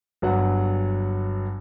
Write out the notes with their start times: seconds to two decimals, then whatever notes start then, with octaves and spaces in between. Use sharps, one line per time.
0.22 G1 F#3 F#5